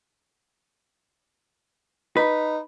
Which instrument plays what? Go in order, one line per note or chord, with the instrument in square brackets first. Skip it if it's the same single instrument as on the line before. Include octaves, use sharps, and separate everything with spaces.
[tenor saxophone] D#4 [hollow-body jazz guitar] B4